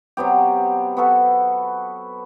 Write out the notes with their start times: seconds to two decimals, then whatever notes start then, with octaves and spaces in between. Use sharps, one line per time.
0.17 C3 F#3 B3 G4
0.97 B3 F#4 A4 B4